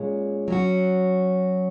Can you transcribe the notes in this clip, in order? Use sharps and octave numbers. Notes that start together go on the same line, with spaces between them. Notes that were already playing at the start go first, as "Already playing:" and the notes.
Already playing: A#2 G#3 C#4
F#3 C#4 F#4